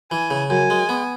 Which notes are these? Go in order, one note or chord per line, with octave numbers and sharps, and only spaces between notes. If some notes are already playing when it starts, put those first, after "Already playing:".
E3 G#5
C#3
F#2 G#5
G#3
B3